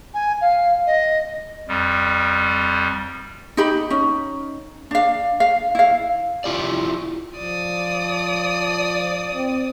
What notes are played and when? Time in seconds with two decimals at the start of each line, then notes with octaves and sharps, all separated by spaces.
0.14 G#5
0.41 F5
0.86 D#5
1.68 F2 G3
3.57 D#4 G4 B5
3.90 C#4 D#4
4.91 D4 F5
5.40 F5
5.75 E4 F5
6.44 E4 F4 G4 D5
7.37 F3 D5 D#6
9.34 C4